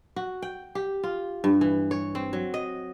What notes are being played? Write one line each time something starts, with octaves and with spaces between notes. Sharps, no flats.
F#4
G5
G4
F4
G2
E3
C#5
C4
F#3
D#5